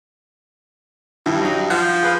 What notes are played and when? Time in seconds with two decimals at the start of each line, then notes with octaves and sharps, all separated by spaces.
1.26 G2 D#3 E3
1.42 F#3 D#4
1.70 F3 F#5
2.02 G#4 B4 F5